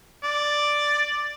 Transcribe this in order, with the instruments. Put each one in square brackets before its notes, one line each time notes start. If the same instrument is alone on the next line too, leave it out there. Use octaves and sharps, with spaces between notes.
[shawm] D5